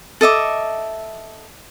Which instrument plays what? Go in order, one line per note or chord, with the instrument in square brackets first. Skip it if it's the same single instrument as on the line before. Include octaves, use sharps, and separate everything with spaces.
[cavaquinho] A4 D#5 E5 D6